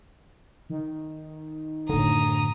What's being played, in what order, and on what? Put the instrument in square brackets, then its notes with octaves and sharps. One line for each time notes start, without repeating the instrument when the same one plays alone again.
[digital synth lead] D#3
[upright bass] F#2 A2 [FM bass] D3 [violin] A#5 D#6